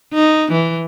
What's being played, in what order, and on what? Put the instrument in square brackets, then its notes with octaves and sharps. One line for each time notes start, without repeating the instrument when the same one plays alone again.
[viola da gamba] D#4
E3